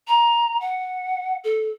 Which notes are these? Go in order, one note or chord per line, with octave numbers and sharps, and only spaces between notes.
A#5
F#5
A4